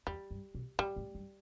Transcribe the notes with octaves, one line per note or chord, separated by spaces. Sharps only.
E2 G3
G2
B2
A2 G3
A2
G2